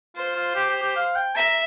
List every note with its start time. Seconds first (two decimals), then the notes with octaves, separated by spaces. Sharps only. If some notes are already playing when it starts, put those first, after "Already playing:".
0.16 F4 C5
0.36 F4
0.56 G4
0.70 G4
0.82 G4
0.96 F5
1.16 G5
1.35 E5 A#5